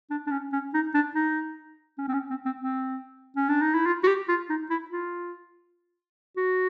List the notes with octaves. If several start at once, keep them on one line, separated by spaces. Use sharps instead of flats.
D4
D4
C#4
C#4
D#4
D4
D#4
C#4
C4
C#4
C4
C4
C4
C#4
D4
D#4
E4
F4
F#4
G4
F4
D#4
E4
F4
F#4